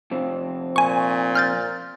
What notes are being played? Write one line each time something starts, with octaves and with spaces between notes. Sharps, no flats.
F2 C3 C4
A#2 G#5 C#6
F6 G6 A6